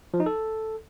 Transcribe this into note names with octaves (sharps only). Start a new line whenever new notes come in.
F3
D#4
A4